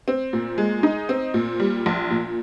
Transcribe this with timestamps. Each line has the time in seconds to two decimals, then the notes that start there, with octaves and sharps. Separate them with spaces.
0.08 C4
0.33 A#2
0.58 G#3
0.83 D#4
1.09 C4
1.34 A#2
1.60 G3
1.86 A#1
2.11 A#2